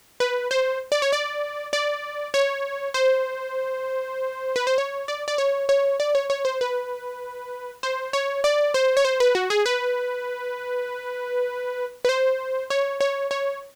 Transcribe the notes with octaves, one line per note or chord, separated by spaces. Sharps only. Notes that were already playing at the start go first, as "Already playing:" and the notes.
B4
C5
D5
C#5
D5
D5
C#5
C5
B4
C5
C#5
D5
D5
C#5
C#5
D5
C#5
C#5
C5
B4
C5
C#5
D5
C5
C#5
C5
B4
F#4
G#4
B4
B4
C5
C#5
C#5
C#5